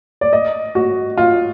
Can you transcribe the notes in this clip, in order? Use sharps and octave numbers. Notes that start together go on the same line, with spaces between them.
D5
D#5
F#4
F4